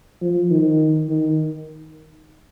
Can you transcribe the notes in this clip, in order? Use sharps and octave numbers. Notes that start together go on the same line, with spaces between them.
F3
D#3
D#3